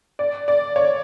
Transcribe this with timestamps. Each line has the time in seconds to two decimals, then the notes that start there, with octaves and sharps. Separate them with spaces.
0.19 D5
0.48 D5
0.76 C#5